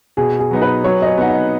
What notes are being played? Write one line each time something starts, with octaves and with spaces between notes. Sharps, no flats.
B2 G#4
G#4
F#3 B3 D#4
B4
F#3 C#5
D#5
C#5
B3 D#4 F#5
D#5